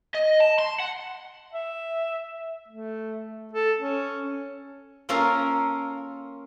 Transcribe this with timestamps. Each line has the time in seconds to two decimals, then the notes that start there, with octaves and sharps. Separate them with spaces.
0.14 D#5
0.40 A5
0.59 C6
0.80 F#5
1.53 E5
2.68 A3
3.53 A4
3.80 C#4
5.09 A#3 C#4 F4 A4 A#4 F5